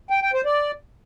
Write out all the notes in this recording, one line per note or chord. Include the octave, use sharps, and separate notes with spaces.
G5
G5
C5
D5